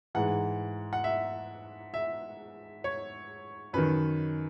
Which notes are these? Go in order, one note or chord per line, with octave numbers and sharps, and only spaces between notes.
G#2 E3 F#5
F#5
E5
E5
C#5
F#2 D#3 B4